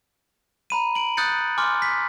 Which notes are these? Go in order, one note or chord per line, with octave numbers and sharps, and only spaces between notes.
A#5 B5 D#7
D7 F#7
D#6 F#6 G6 A6 C#7
G#5 C6 D6 F6
B6